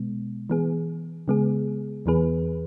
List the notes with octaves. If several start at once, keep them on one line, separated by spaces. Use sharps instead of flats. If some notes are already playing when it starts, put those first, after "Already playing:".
Already playing: B2 G#3 B3
E3 B3 G#4
C#3 G#3 B3 G#4
E2 E3 B3 G#4 B4